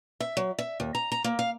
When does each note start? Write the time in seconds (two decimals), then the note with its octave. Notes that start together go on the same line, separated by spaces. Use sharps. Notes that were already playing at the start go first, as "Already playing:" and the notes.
0.20 E5
0.37 F#3
0.58 E5
0.80 D#2
0.95 A#5
1.12 A#5
1.24 A#3
1.39 F5